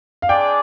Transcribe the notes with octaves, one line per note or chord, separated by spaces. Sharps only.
F5
G#3 D4 G#4 D5 G5